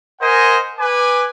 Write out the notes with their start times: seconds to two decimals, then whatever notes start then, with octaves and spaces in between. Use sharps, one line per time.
0.21 A#4 C5 D#5 F#5 G#5
0.78 B4 G#5 D6